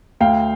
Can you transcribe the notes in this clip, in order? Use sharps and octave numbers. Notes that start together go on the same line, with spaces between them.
D2 F5 G5